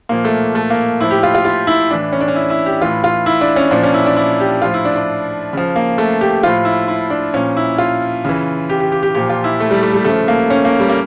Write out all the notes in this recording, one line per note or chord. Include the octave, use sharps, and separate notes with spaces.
A#2 F3 A#3
A3
A3
A#3
A2 F3 E4
G4
F4
F4
F4
E4
A2 E3 D4
C#4
D4
C#4
E4
E4
G4
A2 E3 F4
F4
E4
D4
C#4
A#2 F3 D4
C#4
E4
D4
E4
G4
A2 F3 F4
E4
D4
D4
C#3 F3
A#3
A3
G4
A2 F3 F4
E4
E4
D4
A#2 F3 C#4
E4
F4
C#3 E3
G4
G4
G4
G4
A#2 F3 G4
F4
E4
A3
G3
A3
G3
C#3 F3 A3
A#3
C#4
A#3
G3
A#3